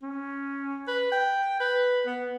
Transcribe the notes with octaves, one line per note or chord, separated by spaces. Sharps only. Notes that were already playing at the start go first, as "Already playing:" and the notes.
C#4
B4
G5
B4
B3